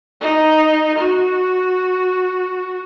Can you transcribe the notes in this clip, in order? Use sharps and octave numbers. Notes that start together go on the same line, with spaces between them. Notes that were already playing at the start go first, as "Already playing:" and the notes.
D#4
F#4